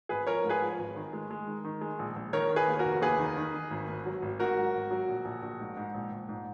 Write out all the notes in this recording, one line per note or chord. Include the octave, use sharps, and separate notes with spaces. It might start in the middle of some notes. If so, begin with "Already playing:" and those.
G#1 G#4 B4
F3 A#4 C#5
G#2
G#4 B4
F3
G#1
D#3
G#3
G#3
D#3
D#3
G#3
A#1
A#1
D#3 A#4 C#5
D#3
G#4 B4
D#2
F#4 A#4
F1
D#2 G#4 B4
D#3
D#3
D#3
G#1
G#1
F#3
G#1
G#2 F#4 A#4
F#3
G#1
F#3
A#1
A#1
A#1
G#2
G#2
A#1
A#1
G#2